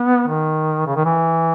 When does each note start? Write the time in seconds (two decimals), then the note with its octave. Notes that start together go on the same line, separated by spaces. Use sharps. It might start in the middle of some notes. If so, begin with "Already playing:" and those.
Already playing: B3
0.28 D#3
0.87 C#3
0.96 D#3
1.05 E3